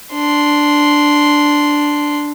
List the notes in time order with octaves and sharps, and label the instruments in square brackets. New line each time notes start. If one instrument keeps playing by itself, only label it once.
[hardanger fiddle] D4 C6